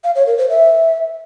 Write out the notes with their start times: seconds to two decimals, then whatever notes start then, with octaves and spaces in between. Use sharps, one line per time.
0.04 F5
0.15 C#5
0.27 A#4
0.38 C5
0.49 E5